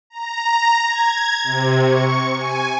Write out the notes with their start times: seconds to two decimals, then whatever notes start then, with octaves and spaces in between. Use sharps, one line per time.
0.10 A#5
0.87 G#6
1.43 C3
1.83 C#6
2.38 G#5